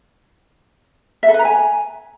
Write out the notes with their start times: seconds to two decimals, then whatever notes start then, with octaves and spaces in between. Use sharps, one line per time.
1.23 E5
1.28 A4
1.34 B4
1.39 A#5
1.45 G#5